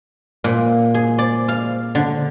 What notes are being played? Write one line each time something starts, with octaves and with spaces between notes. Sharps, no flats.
A#2
G#4
D5
F5
D3